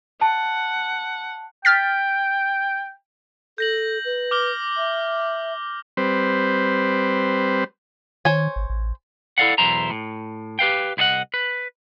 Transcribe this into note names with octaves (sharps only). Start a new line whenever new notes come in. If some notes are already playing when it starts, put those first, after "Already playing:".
F#5 A5
G5 F6 A6 B6
A4 G6 A#6 F#7
B4
D6 F6 G7
E5
G3 C4 B4 C5
D#3 C5 C#5 G#5
G#1
A1
E4 A4 A#4 D5 F5 F#5
B1 E2 E4 C5 A#5
A2
G4 B4 F5 G5
C2 E4 F#4 D#5 F#5
B4